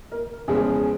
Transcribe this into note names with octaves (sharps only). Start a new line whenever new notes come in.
A#4
E2 C#3 F3 G#3 B3 G#4